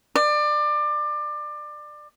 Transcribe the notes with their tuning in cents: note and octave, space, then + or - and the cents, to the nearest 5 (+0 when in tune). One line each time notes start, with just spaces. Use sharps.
D5 +25